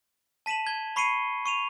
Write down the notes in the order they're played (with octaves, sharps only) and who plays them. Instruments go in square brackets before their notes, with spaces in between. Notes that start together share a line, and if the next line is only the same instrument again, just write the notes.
[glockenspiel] A5 B6 D#7 E7 F#7
G#6 G7
B5 C#6 C7 C#7 D#7 G7
C#6 D#7 F7